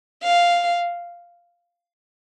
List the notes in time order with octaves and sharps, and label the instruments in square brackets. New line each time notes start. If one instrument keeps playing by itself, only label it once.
[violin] F5